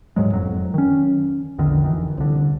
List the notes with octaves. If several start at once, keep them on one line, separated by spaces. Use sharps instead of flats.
D#1 G#2 F#3 G#3
F#1 F2 F#3
D#3 C#4
A#1 E2 D3 D#3
F1 D#3 E3
C2 D3